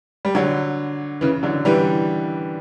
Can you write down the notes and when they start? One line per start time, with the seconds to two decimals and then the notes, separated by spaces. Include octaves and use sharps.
0.25 G3
0.35 D3 F#3
1.21 C#3 E3
1.43 D3 F#3
1.65 E3 G3